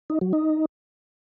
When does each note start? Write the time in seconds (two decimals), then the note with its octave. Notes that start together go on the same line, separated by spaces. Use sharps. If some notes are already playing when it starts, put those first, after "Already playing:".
0.10 D#4
0.21 F#3
0.33 D#4